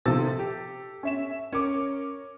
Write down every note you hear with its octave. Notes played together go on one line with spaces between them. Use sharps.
C3 D#3 F3 A4 E6 A6
G4
C#4 E5 E7
C#4 A#4 C#5 D6